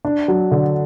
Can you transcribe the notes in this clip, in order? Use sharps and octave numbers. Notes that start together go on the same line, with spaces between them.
D4
F#3
D3